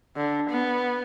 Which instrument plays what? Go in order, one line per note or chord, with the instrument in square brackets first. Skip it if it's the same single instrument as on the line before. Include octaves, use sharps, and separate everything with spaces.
[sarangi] D3
B3